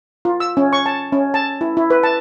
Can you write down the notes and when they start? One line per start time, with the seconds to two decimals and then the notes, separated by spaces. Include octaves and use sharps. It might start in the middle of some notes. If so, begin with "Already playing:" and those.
0.25 F4
0.40 E6
0.57 C#4
0.73 C#6
0.86 A5
1.12 C#4
1.34 A5
1.61 E4
1.77 E4
1.90 B4
2.03 A5